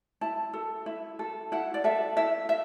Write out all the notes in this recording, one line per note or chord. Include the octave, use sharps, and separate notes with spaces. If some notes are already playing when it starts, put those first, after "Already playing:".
E4 A5
A4
E4
A4
E4 F#5
D5
A4 E5
E4 E5
E5